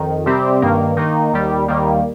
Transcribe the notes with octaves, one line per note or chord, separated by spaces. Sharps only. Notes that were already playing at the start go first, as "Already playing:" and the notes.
Already playing: F2 D#3
C3 G3 C4 G4
G2 D#3 A#3
D#3 A#3 D#4
D#2 D#3 G3
D#2 D#3 G3 A#3